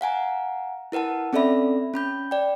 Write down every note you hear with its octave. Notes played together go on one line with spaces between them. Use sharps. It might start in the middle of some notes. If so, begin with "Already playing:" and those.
F5 F#5 G#5 A#5
E4 A#4 B4 F#5 A5
C4 C#4 A4 D5 E5 B5
C#4 B5 G6
D5 G5